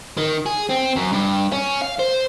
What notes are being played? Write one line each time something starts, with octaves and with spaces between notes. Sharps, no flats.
D#3
G#4
C4
F#2
G2
C#4
F5
C5